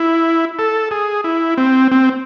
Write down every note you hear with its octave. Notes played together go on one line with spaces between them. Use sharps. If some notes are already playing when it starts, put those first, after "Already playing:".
Already playing: E4
A4
G#4
E4
C4
C4